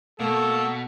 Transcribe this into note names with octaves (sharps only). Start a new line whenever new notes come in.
B2 A3 A#3 A4